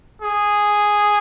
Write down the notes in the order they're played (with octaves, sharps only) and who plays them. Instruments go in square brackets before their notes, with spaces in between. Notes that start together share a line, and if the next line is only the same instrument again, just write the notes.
[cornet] G#4